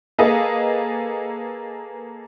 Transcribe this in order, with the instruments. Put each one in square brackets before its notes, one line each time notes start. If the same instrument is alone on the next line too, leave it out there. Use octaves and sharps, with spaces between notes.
[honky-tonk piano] A#3 G#4 A4 B4 D#5